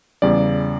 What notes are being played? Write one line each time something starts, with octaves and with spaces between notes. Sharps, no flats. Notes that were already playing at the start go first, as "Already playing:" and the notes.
E2 C#3 G3 D5